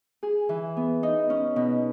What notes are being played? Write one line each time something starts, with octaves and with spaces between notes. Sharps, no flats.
G#4
E3
B3
D#4
C#4
B2